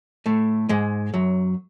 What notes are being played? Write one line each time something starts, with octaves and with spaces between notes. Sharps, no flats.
A2 A3
G#2 G#3
F#2 F#3